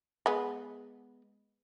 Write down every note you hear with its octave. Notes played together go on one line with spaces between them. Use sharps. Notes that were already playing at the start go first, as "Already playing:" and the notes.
G#3 B3